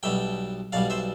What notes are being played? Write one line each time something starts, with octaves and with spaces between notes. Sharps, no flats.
B1 B2 G3 E5 G5
B1 B2 G3 D5 F5
C5 E5